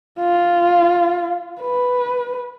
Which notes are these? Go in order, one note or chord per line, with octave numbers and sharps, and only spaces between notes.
F4
B4